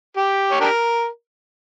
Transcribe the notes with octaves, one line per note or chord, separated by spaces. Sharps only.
G4
C#5
D4 G4 A#4